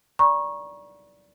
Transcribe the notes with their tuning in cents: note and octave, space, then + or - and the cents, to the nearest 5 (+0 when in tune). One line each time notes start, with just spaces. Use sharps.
D5 -15 A#5 +30 C#6 -15